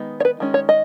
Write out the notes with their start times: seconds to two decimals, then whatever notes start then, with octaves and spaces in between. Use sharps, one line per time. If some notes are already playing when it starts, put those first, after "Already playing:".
Already playing: D#3 G#3 B3 D#4
0.20 C#5
0.25 B4
0.40 D#3 G#3 C#4
0.54 C#5
0.69 D#5